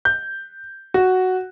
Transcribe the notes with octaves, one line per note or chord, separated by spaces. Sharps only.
G6
F#4